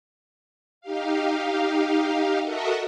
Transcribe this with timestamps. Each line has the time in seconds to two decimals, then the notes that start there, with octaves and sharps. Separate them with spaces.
0.81 D#4 G4 F5
2.42 F#4 A4 A#4 D#5 E5 F#5